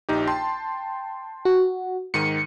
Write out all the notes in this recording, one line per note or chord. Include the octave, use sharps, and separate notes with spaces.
A#1 D#4 G4
G5 A5 C6
F#4
G#2 D#3 C#7 D#7